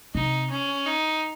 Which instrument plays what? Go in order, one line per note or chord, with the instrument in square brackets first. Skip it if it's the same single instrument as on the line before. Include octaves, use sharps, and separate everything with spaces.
[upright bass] C3 [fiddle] D#4
[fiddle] C#4
D#4